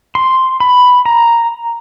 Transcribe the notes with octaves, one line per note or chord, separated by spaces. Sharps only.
C6
B5
A#5